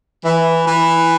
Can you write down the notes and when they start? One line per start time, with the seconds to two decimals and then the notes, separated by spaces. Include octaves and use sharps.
0.24 E3
0.65 E3